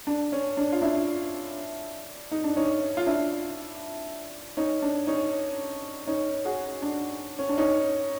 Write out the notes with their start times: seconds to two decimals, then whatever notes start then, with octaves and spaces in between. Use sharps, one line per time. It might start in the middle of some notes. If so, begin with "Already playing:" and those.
0.07 D4
0.32 C#4
0.57 D4
0.72 F4
0.82 D4 E4
2.31 D#4
2.44 D4
2.56 C#4 D#4
2.97 F4
3.07 D4 E4
4.57 C#4 D#4
4.82 D4
5.07 C#4 D#4
6.07 C#4 D#4
6.45 F#4 G#4
6.82 D4
7.39 C#4
7.49 D4
7.58 C#4 D#4